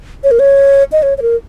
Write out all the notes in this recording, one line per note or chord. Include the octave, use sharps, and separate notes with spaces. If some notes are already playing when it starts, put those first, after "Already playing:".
C#5
A#4
C#5
D#5
C#5
C#5
A#4